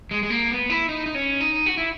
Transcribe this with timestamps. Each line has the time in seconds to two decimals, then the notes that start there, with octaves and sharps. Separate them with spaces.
0.11 G#3
0.23 G#3
0.30 A#3
0.51 B3
0.70 E4
0.89 D#4
1.06 D#4
1.15 C#4
1.41 D#4
1.66 F#4
1.77 E4